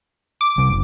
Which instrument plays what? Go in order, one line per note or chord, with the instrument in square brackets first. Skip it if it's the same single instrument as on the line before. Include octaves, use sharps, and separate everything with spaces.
[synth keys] D6
[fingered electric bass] C3 G3
F#1